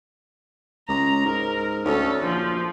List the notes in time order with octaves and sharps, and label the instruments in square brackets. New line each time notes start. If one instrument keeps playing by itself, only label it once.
[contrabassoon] C#2 [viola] A#5
[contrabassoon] G#2 [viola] A#4
[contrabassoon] D2 [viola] C#4 A4
[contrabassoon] A#1 [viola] F3